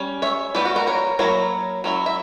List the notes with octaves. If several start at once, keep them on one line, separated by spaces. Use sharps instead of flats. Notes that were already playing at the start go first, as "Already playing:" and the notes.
Already playing: G3 C#4
C#5 E5
E3 G3 B3 B4 D5
F#4
F#4 A#4
A#4 C#5
F#3 A#3 E4 A#4 C#5
F#3 C#4 E4
E5